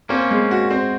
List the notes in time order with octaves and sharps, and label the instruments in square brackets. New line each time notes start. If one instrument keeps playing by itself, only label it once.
[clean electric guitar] A#3 C#4 [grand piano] C4
[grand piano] G#3
F#4
C4